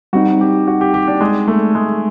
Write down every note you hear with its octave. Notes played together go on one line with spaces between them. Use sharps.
G3 C4 D#4 F#4
G4
F#4
G4
G4
D4
G#3
A3
G#3